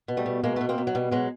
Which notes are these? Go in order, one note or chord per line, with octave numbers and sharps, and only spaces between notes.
B2
G3 A3
B2
B2 G#3 A#3
B2 A3 B3
A#3 C4
B2
F#3
B2 G3
B2 F#3 G#3